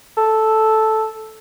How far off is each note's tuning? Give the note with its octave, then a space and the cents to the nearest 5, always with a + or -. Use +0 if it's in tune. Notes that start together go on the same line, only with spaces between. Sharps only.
A4 -5